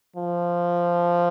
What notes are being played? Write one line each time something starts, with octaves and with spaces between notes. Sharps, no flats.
F3